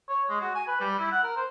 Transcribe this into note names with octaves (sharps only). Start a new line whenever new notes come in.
C#5
G#3
F#4
G#5
B4
G3
E4
F#5
A#4
C5